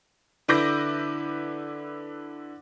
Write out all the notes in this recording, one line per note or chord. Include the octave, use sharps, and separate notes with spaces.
D3 E4 B4 D6 G6 A#6